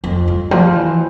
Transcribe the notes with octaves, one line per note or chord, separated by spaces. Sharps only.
F2
G2
F3
E3